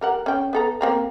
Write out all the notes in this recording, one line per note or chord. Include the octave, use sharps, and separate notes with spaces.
G3 A#4 F#5
C#4 G5
B3 A4 A#5
A#3 C4 A#5